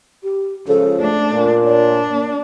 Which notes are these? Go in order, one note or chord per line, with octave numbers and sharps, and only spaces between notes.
G4
C#2 C#3 F3 A4
A3 D4
A#2
D4 C#5
A#3